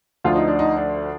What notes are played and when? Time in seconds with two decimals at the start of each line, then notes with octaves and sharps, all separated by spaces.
0.24 D2 D3 F3 F4
0.36 D#4
0.48 D4
0.59 D#4
0.77 D4